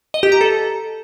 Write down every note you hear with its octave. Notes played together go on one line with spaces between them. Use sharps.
D#5
G4
A#5
A4